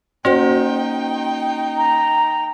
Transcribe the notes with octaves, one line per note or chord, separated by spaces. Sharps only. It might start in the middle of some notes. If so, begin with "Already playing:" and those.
A#3 C#4 D#4 F#4 C5 G5
A#5